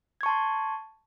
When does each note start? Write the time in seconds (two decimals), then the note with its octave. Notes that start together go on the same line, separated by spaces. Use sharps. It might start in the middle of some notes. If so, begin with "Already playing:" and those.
0.21 G#6
0.23 C#6
0.26 A5
0.29 C6